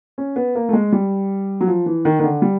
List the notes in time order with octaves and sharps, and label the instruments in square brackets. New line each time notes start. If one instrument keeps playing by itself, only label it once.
[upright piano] C#4
B3
A#3
A3
G#3
G3
F#3
F3
E3
D#3
D#3
D3
G3